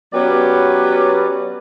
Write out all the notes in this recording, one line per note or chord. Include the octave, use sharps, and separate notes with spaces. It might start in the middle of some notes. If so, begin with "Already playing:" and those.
F#3 B3 C#4 G4 B4 D5